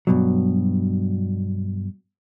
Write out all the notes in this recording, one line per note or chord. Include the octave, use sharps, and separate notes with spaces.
G2 B2 F#3